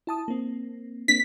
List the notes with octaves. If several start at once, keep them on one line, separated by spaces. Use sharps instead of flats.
E4 A5 D#6
A#3 C4
A#3 C4 D4 B6